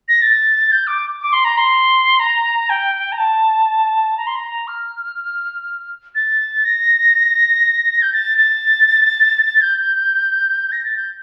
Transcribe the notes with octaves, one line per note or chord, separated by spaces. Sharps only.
A#6
A6
G6
D6
D6
C6
A#5
C6
A#5
G5
A#5
A5
A#5
C6
A#5
F6
A6
A#6
G6
A6
A6
G6
A#6
A6
G6